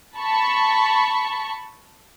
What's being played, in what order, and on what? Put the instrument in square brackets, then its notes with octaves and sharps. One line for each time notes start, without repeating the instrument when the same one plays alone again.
[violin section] A5 B5 C#6